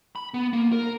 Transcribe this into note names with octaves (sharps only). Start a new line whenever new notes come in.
B5
B3
A#3
A#4